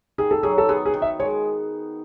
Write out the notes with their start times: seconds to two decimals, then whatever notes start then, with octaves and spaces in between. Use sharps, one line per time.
0.18 D#3 G#4
0.31 A4
0.43 F#3 G#4
0.58 A4
0.69 B3 G#4
0.86 G#4
0.94 D#3
1.02 E5
1.20 G#3 C#5